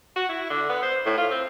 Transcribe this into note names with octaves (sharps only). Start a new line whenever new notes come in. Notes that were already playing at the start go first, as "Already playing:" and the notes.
F#4
E4
D3
B3
C5
A2
F4
C4